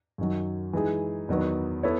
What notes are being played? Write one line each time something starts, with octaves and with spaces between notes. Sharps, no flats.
F#2 D#3 F#3
E3 G#3 D#4 G#4
E2 D#3 F#3 B3
B3 E4 A4 C#5